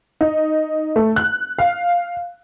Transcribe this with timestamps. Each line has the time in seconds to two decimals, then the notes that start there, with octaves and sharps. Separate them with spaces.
0.21 D#4
0.96 A3
1.16 F#6
1.58 F5